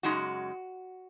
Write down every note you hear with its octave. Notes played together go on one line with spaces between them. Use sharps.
F#2 C#3 G#3 D#4 F#4